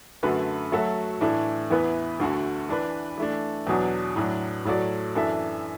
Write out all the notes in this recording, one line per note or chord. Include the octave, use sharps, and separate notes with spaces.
F#2 D3 A3 F#4 B4
F#3 A3 F#4 A4 E5
A2 E3 A3 D4
E2 E3 B3 E4 B4
D2 D3 A3 F#4
E3 D4 B4
E3 A3 D4
E2 B2 F#3 D4
A2 F#3 D4
A2 F#3 A3 F#4 D5
F#2 E3 D4 A4 E5